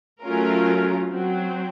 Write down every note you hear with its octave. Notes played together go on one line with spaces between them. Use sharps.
F#3 A3 C#4 F4 A#4
F#3 C4 F#4